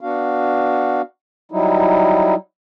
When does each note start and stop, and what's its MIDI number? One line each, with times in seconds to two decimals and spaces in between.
0.01 1.02 59
0.01 1.02 62
0.01 1.02 66
0.01 1.02 77
1.52 2.35 54
1.52 2.35 55
1.52 2.35 63
1.52 2.35 64